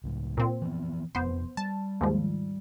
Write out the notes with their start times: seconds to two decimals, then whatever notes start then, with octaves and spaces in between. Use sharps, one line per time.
0.04 C#2 A2
0.37 A#2 C4
0.62 E3 F3 B3
1.15 E1 F2 B3 C5
1.57 G3 A5
2.01 D#2 G#2 F3